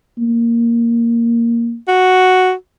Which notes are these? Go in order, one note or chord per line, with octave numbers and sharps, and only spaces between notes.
A#3
F#4